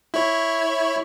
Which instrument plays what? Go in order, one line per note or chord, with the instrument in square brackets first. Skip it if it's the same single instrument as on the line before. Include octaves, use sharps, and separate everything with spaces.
[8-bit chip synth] E4 C#5